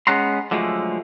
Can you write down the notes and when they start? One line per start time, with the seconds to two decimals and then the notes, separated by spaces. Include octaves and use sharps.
0.07 G#3 B3 C#4 F#5 A#5 C6
0.51 D3 F3 F#3 G#3 A3